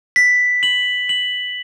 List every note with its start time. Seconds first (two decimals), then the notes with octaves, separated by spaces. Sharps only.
0.16 B6
0.63 F#7
1.09 F#7